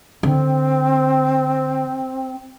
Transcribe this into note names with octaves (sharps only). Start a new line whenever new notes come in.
D3 C4